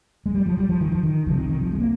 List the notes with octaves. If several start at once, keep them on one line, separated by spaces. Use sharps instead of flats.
G#3
G3
F3
G3
F3
D#3
F3
D#3
C2 C3 F3
D#3
D#3
F3
G#3
A#3